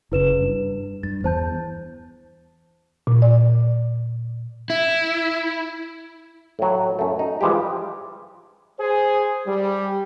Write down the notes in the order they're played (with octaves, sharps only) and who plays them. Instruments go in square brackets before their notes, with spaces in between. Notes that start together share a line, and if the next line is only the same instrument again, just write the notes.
[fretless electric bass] F#1 C#3 [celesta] E4 B4 E7
[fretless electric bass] G2
[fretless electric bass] G2 [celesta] A6
[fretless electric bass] E2 [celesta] C5 A5 G6
[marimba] A#2
D5
[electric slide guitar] E4
[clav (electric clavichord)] A2 F#3
F#2 A3
D#4
E3 F3 G3 G#3 G4
[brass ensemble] G#4 C5
G3